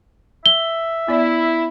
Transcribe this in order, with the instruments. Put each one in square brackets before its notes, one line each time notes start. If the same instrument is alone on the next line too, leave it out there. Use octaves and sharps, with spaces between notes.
[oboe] E5 [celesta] G7
[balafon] B3 D5 [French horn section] E4